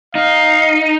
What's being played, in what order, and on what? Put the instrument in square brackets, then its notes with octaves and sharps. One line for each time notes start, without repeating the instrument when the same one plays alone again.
[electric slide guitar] D#4 [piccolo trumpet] F5